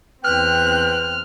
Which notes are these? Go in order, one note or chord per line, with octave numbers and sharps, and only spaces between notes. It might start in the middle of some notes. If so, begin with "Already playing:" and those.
E2 C4 B4 G5 F6 F#6